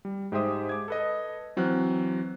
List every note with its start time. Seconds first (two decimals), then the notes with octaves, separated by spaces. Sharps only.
0.05 G3
0.32 G#2 G#3 G4 C5 E5 D#6
0.69 D6 G#6
0.88 A4 B4 D#5
1.57 E3 F#3 C4 F6 F#6